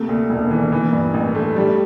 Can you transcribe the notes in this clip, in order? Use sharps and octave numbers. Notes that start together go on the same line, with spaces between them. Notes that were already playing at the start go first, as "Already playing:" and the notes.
Already playing: C3 A3 A#3
D2
E1
E3
E3
G2
A1
A3
G3